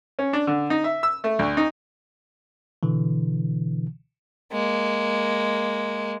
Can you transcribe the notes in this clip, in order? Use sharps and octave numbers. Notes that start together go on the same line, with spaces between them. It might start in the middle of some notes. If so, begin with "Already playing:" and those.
C#4
D4
D3
D#4
E5
E6
A3
D2
D#4
B2 D3 E3
G#3 A#3